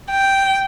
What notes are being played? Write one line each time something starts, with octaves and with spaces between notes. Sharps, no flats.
G5